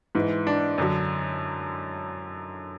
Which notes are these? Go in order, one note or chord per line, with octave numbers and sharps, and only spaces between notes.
G#2 E3
D4
F#2 D3 F#3